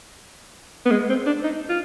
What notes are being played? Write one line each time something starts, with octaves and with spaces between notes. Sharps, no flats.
B3
G#3
C4
D4
D#4
F4